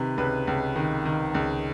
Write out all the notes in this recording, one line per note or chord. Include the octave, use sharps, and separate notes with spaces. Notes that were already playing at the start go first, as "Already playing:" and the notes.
Already playing: C3 D#3 B4
C#2 B4
C#2
D#3
D#3
C#2